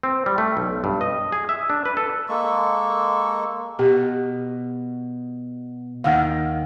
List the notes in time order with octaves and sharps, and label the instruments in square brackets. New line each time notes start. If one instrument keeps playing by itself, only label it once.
[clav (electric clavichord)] C4
G3
A3
B1
G2
D#5
G#4
E5
D4
B4
A4
[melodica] G#3 A#3 A4 C#6
[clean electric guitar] B2 [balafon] G4
[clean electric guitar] D#2 D#3 [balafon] F5 F#5